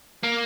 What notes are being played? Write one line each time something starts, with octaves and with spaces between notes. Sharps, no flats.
A#3